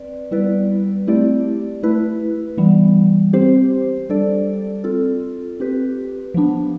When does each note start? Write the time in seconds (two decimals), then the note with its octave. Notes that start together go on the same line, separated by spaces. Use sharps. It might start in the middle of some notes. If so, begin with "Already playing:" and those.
Already playing: C4 B4 D5
0.31 G3 B3 E4 B4 D5
1.07 A3 C4 E4 G4 D5
1.83 A3 E4 B4
2.57 E3 G3 B3
3.33 C4 G4 C5
4.09 G3 D4 A4 D5
4.84 C4 F4 A4
5.60 C4 G4 B4
6.34 F3 B3 D4